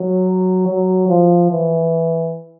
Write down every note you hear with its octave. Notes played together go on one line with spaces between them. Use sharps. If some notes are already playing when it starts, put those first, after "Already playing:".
Already playing: F#3
F#3
F3
E3